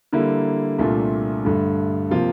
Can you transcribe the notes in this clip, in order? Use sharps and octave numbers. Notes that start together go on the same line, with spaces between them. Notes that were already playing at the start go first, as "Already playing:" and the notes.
D3 G3 A#3 E4
C2 A#2 A3 D4 F4
G2 D3 A3
C3 F3 A#3 F4